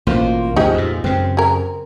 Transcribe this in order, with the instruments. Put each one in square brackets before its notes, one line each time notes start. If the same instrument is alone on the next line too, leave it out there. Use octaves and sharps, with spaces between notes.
[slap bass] A1 B2 [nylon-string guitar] A#3 F4 C5
[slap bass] D2 G#2 [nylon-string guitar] F3 G#4 [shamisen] D#4 G4
[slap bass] F2 A#2
[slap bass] F#2 C#3 [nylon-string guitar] C4
[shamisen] G#4 A#4